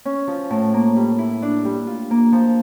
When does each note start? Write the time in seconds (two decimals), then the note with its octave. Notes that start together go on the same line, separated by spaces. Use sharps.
0.05 C#4
0.28 F3
0.51 A2
0.74 A#3
0.96 G3
1.18 E4
1.42 D4
1.65 G3
1.87 F4
2.11 A#3
2.33 F3